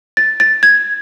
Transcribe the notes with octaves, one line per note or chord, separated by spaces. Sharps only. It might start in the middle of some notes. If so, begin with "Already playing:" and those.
A6
A6
G#6